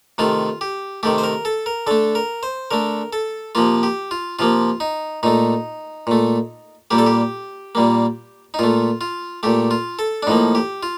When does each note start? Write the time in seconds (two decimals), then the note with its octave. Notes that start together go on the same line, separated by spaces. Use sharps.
0.18 C3 D#3 A3 F4
0.61 G4
1.03 C3 D#3 A3 G4
1.18 C5
1.24 A#4
1.45 A4
1.66 A#4
1.87 D3 A3 A4
2.15 A#4
2.43 C5
2.71 D3 A3 A#4
3.13 A4
3.55 C3 F3 A#3 F4
3.83 G4
4.11 F4
4.39 C3 F3 A#3 F4
4.80 D#4
5.23 A#2 A3 D#4
6.07 A#2 A3
6.91 A#2 G3 A#3 G4
6.98 A4
7.06 G4
7.75 A#2 G3 A#3
8.54 D#4
8.59 A#2 A3 F4
9.01 F4
9.43 A#2 A3 G4
9.71 F4
9.99 A4
10.23 D4
10.27 A2 F3 A#3 D#4
10.55 G4
10.83 F4